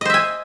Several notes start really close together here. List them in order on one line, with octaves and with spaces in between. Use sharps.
D#5 C5 E5 G#5